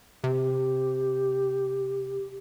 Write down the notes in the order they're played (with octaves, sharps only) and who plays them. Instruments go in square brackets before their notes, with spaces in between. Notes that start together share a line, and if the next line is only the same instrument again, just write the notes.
[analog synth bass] C3 [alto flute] G4